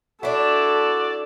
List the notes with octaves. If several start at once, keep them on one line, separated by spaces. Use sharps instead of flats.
D4 E4 F#4 A4 D5